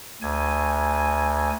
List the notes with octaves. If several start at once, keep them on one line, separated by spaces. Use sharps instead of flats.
D2 G#5